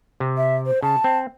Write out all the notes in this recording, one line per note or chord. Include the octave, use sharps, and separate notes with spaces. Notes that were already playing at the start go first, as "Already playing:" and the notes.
C3
E5
C5
C#3 A5
C4